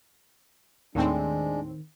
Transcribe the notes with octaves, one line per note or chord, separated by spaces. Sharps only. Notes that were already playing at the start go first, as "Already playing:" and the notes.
D#2 A2 D#3 G#3 C4 D4